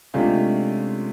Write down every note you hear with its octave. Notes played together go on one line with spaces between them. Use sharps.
C3 G#3 A3 C#4 D4 F4